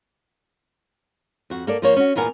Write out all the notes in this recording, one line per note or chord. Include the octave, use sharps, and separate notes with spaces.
F2 F#4
A#3 A4 D5
F3 A#3 C#5
C#4 F#4
E2 A#2 B3 A#4 G#5